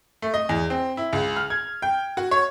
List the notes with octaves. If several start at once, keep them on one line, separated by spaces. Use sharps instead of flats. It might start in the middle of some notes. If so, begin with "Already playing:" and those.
A3
D#5
E2
C4
E4
C#2
F6
G#6
G5
F#4
C#5